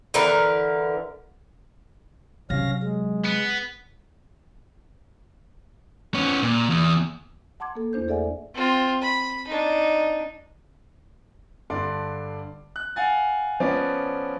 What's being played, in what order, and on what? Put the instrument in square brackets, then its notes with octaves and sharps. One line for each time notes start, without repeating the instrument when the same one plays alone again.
[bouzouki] D3 E3 A#4 B4
[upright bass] C3 F#3 [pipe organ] C#4 F5 A#6
[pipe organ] G#3
[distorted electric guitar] B3
[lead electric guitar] B3 C#4
A#2
E2
[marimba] F#5 A5 C6 D6 G#6
A#3 A4
E2 A3 D4 C5 G6
G#4 A4 D5 E5 F#5 G#5
[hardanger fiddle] C4 F4
B5
D4 D#4
[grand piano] G2 D3 D5 C6
F#6
F5 F#5 G#5 A6
F3 B3 C#4 D5